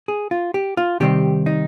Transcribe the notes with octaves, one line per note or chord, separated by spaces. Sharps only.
G#4
F4
G4
F4
C3 D#3 G3 C4 G4
D#4